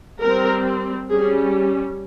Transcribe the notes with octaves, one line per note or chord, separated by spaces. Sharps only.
G3 C4 A#4
G3 C#4 G#4